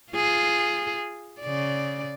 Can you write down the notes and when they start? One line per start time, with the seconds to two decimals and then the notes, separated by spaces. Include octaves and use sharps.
0.13 F4 G#4
1.41 C#3 D5